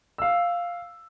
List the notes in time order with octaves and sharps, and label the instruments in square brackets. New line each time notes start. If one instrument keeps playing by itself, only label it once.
[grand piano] F5 E6